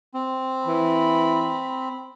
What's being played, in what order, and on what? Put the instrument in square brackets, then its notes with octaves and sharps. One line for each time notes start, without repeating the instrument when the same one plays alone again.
[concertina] C4
[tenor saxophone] E3 [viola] B5